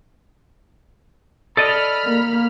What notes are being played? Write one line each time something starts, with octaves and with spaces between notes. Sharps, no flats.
A4 D5 D#5 B5 F6
A#3